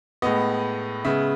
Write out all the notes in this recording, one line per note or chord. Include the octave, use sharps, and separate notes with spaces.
A2 G#3 B3 D#5
C#3 G#3 B3 E5